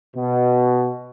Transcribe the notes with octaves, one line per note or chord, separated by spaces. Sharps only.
B2